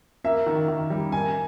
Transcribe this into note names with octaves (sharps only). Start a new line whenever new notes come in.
A#3 E5
D#3
D#3
G3
A#3 G#5